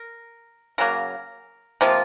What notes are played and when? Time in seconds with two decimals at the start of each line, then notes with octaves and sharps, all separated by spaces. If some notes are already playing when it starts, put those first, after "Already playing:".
Already playing: A#4
0.78 C#3 F#3 A#3 A#4
1.81 C3 F3 A#3 F4